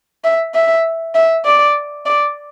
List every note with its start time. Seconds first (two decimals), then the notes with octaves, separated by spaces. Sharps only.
0.24 E5
0.55 E5
1.15 E5
1.46 D5
2.06 D5